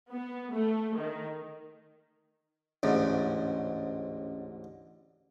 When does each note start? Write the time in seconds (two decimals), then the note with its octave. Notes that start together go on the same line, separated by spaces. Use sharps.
0.12 B3
0.54 A3
0.99 D#3
2.83 A1 D2 G#2 C#4 D#5